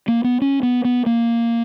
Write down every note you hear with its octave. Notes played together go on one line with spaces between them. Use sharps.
A#3
B3
C#4
B3
B3
A#3